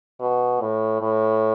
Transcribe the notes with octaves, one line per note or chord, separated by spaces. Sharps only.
B2
A2
A2